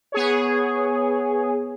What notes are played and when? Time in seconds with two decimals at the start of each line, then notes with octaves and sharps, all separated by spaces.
0.12 B3 G#4 C#5